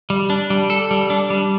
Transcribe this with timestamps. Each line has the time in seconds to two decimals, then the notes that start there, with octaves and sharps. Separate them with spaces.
0.10 G3
0.30 D4
0.50 G3
0.70 A4
0.91 G3
1.10 D4
1.30 G3